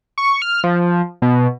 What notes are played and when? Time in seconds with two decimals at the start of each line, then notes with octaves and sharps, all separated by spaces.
0.18 C#6
0.42 F6
0.64 F3
1.22 B2